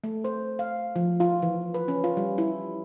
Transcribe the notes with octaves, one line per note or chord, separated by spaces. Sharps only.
A3
C5
F5
F3
F4
E3
B4
C#4
F4
G3
E4